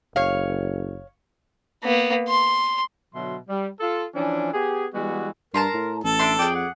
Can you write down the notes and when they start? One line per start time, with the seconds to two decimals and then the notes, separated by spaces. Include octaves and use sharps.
0.16 F#1 C#5 F5
1.84 A#3 B3
2.28 C6
3.14 B2 D3 F#3 E5 C6
3.49 G3
3.80 F4 A4
4.15 E3 F3 C#4 D4
4.53 B3 G4 G#4
4.94 E3 G3 G#3 B3 F#4
5.54 G2 A#4 A5 A#5 C6
5.74 A2
6.04 A1 A4
6.19 D4 E5 C6
6.39 F2 G#4 D5 G5
6.55 F#5